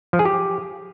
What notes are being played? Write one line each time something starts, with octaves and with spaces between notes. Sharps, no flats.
F3
G#4
G4